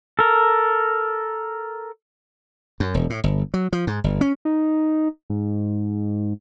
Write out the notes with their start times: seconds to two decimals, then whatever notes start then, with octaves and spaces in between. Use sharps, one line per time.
0.19 A4 A#4
2.80 F#2
2.94 E1
3.10 A2
3.24 G1
3.54 F#3
3.73 F3
3.87 G#2
4.04 G1
4.21 C#4
4.45 D#4
5.30 G#2